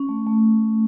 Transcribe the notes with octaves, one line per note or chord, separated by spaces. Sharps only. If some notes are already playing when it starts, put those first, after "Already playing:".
Already playing: C#4
A3
A3